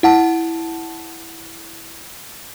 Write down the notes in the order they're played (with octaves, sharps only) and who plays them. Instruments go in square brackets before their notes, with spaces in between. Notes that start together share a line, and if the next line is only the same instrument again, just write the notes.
[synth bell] E4 F#5 A5